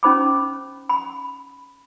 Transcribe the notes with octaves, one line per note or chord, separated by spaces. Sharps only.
C#4 D#4 C5 B5 D6
B5